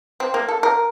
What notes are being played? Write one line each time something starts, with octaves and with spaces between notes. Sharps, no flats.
C4
A#3
A4
A#4